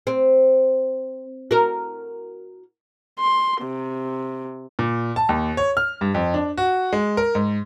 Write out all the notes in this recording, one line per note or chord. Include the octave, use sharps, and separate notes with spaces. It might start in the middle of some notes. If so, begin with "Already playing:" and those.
C4
F#4 A#4
C6
C3
A#2
A5
D#2
C#5
F6
G2
F2
D4
F#4
G#3
A#4
G#2